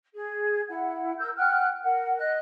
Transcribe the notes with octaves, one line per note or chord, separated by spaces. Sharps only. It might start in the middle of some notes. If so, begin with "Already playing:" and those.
G#4
E4 F#5
A#4 E6 G6
F#5 G5 F6 F#6
A#4 F#5
D#5 F#6